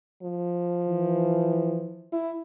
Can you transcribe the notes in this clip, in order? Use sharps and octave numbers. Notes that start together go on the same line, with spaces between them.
F3
E3
E4